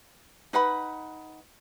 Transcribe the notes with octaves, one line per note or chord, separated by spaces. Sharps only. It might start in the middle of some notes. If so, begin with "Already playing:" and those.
D#4 B4 F#5 B5